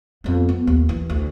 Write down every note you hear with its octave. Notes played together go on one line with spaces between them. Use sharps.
F2 B3
B3
D#2
E3
D2